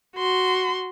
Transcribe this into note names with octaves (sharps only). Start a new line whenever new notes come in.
F#4 C6